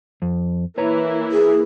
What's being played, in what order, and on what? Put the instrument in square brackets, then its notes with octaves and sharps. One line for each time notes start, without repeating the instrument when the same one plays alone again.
[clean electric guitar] F2
[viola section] E3 A#3 E4 [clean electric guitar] B4 C#5 A#5
[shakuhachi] G#4